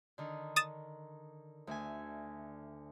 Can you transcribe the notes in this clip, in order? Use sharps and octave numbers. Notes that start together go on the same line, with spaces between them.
D3 D#3
D#6 A6 E7
D2 E5 G#5